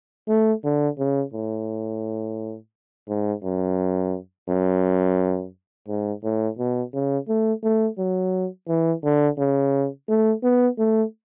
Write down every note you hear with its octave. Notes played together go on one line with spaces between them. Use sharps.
A3
D3
C#3
A2
G#2
F#2
F#2
G#2
A2
B2
C#3
A3
A3
F#3
E3
D3
C#3
A3
B3
A3